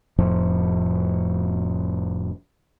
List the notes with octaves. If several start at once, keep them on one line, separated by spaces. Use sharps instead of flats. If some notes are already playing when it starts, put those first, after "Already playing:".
F1 F2 A2 F3